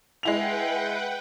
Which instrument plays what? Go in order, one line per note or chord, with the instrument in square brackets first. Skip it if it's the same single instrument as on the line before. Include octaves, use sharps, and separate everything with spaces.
[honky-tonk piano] G#3 E4 F7 [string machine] B4 F#5 G5